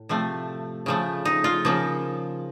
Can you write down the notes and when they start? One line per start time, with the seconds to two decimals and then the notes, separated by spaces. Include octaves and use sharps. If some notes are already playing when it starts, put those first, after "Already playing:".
Already playing: A2
0.09 C3 F3 A3
0.86 C#3 F3 A3
1.25 D#4
1.44 F4
1.65 C#3 F3 A#3